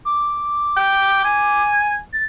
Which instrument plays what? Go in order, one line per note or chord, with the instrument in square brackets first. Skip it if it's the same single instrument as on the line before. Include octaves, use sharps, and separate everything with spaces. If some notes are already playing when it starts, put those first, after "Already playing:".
[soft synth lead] D6
[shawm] G5
G#5
[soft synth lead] A6